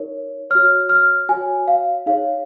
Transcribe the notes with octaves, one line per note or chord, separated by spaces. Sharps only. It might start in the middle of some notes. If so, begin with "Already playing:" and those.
Already playing: D#4 A#4 C#5
F#4 C#5 F6
F6
F#4 C#5 G#5
F5
D#4 G#4 C#5 F5